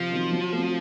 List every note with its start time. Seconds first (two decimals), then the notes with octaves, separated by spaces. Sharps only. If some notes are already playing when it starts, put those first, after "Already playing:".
Already playing: C3 F3
0.12 D#3 F#3 C4
0.32 F#3
0.53 A3 C4